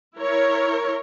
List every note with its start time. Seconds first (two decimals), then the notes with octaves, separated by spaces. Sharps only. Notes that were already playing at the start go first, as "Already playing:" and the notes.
0.18 E4 A#4 C#5